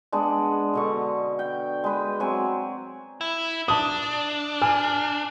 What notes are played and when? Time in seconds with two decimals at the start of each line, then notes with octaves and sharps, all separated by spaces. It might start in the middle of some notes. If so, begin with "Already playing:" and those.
0.12 G#3 B3 D4
0.73 B2 D3 C#6
1.39 G5
1.84 G#3 B4
2.20 F#3 C4 G#5
3.21 E4
3.68 D4 A5 D#6
4.62 G#5 F6